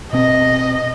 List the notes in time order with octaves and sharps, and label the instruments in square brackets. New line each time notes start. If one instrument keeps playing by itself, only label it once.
[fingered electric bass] B2 C4 [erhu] D#5